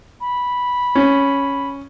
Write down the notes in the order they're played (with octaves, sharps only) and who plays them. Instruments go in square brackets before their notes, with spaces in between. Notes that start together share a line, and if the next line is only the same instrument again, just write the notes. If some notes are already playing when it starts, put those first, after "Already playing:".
[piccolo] B5
[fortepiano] C#4